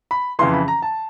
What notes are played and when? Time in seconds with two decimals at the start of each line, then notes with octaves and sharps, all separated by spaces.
0.11 B5
0.39 F2 C#3 E3 C6
0.54 B5
0.68 A#5
0.82 A5